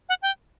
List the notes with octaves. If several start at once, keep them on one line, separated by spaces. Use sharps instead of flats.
F#5
G5